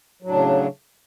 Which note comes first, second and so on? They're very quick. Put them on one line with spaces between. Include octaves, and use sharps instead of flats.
F#3 A2 D4 C#3